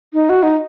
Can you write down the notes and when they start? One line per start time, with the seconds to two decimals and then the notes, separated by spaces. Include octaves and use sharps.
0.14 D#4
0.29 F#4
0.43 D#4